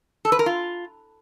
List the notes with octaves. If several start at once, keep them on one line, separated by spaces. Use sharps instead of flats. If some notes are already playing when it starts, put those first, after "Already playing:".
A4
B4
A#4
F4